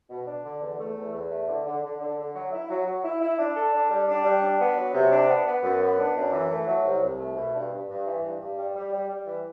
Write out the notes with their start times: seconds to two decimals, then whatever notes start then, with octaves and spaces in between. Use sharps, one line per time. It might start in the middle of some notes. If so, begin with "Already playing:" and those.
0.10 B2
0.27 D4
0.45 D3
0.62 E2
0.80 A3
0.97 E2
1.14 E2
1.31 A3
1.48 D3
1.66 D3
1.83 D3
2.00 D3
2.18 D3
2.35 F#3
2.52 E4
2.70 F#3
2.86 F#3
3.04 E4
3.22 E4
3.39 D4
3.56 A4
3.73 D4
3.91 G3
4.08 D4
4.25 G3
4.42 D4
4.60 B3
4.77 F#3
4.94 C3
5.12 D4
5.29 B3
5.46 B3
5.63 F#2
5.81 B3
5.98 D4
6.16 F#2
6.33 E3
6.50 A3
6.67 F#3
6.85 C2
7.02 C2
7.19 A3
7.37 B2
7.54 G2
7.72 G2
7.89 G2
8.06 E3
8.23 G2
8.40 G2
8.58 G3
8.75 G3
8.92 G3
9.09 G3
9.27 E3